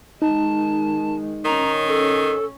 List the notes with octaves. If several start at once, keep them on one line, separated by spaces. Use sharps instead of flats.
D#3 G#3 D#4 A5
D#3 C#4 A#5
A4